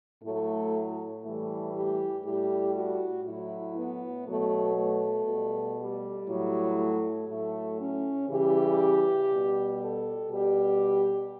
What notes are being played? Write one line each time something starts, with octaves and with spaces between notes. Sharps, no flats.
A2 F#3 A3
A2 E3 G3 A3
G4
A2 G3 G4
F#4
A2 F#3 E4
B3
B2 F#3 A3
A3
B2 G3
G3
A2 F#3
A3
A2 F#3 A3
C#4
C#3 E3 G3 G4
B2 G3
A4
B2 G3 G4